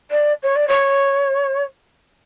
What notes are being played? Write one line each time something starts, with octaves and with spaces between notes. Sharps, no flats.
D5
C#5
D5
C#5